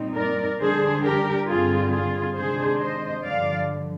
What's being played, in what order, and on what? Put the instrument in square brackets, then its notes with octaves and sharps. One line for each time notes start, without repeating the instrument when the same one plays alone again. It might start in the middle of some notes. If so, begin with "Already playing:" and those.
Already playing: [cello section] A#2 G3 C4 D#4
A#4 D5
D3 G3 D4 G#4 C5
G4 A#4
G2 D3 G3 C4 F4 G#4
F4 G#4
C3 D#3 G#3 D4 G#4 C5
C5 D#5
G2 D3 F3 D5 F5